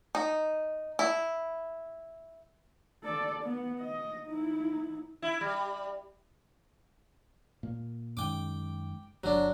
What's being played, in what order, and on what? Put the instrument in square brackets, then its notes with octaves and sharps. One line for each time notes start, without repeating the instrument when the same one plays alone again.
[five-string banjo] D#4
E4
[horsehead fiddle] A4 D5
B3
D#5
D#4 E4
[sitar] E4
G3
[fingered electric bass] A#2 A#3
[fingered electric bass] F#2 D#3 G#3 [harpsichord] G5 D6
[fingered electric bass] G1 [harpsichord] F#3 D4